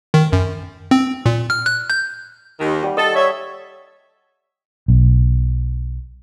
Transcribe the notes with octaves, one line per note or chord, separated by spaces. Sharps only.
D#3
F#2
C4
A#2
F6
F#6
G6
D#2 D#3
G3 F#5
A4 D#5
C#5 E5
B1